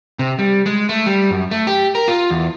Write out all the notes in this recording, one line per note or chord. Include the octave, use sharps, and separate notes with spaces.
C3
G3
G#3
A3
G3
F#2
A3
G4
A#4
F4
E2